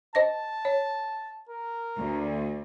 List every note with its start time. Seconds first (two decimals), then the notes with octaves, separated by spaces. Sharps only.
0.15 C5 D#5 A5 A#6
0.65 C#5
1.49 A#4
1.97 D2